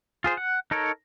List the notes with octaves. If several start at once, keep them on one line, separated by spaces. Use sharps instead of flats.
F4 G#4 C5
F#5
D#4 A4 A#4 C#5